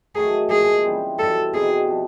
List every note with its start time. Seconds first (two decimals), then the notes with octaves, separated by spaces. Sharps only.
0.15 D#3 F#3 A3 G#4
0.50 A#2 F3 G#3 G#4
0.84 C#3 E3 G3 C4
1.19 B2 G3 C4 A4
1.54 B2 G3 C4 D#4 G#4
1.88 C3 F3